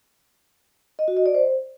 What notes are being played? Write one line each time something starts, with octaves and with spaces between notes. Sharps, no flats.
D#5
F#4
D#5
D5
C5